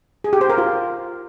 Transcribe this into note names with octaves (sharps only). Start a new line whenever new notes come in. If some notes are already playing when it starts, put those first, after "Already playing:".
G#4
G4
C5
A#4
F4